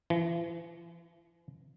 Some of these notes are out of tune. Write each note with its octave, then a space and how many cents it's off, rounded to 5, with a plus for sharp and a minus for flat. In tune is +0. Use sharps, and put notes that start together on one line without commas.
E3 +45